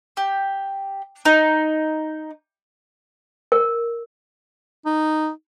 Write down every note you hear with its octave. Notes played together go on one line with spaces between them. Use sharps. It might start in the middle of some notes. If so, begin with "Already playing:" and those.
G4
D#4
A#4
D#4